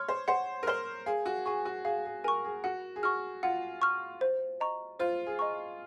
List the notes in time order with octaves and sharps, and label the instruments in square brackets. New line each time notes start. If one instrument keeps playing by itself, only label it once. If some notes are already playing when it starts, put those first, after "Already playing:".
Already playing: [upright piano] C#5 [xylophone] C6 F6
[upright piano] C5
[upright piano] C5 [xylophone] F#5
[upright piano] A#4
[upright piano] C5 [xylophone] C6 F6
[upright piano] G#4 [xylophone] F5
[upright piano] F#4
[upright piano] G#4 [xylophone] G#5 C#6
[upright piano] F#4
[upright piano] G#4 [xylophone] F5
[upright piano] G#4
[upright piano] A#4 [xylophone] G#5 C#6
[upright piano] G#4
[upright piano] F#4 [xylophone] F#5
[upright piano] G#4
[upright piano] F#4 [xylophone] C#6 F6
[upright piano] F4 [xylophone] F#5
[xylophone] C#6 F6
C5
D#5 A#5 C#6
[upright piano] F4 [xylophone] C5
[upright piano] G#4
[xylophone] D#5 A#5 C#6